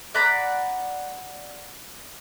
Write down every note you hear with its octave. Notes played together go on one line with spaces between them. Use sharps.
D5 F#5 A#5 B5